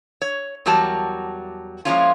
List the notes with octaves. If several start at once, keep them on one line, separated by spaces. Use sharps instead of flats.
C#5
E2 F#3 G3 F#4 A#4 A5
F3 G#3 A#3 C#4 E4 F4